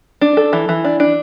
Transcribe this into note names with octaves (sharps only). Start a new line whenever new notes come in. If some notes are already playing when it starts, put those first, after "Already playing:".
D4
A4
E3
E3
D4
D4